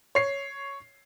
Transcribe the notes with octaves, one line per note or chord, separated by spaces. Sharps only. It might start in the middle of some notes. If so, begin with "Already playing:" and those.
C#5 C7